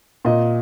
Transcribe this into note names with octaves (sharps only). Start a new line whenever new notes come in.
A#2 D#5